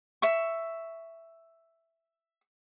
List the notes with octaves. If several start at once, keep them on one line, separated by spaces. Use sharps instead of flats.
E5 C#6